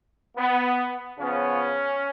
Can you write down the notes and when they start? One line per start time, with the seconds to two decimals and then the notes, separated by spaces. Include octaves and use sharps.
0.37 B3
1.18 C#3 F3 B3 C#4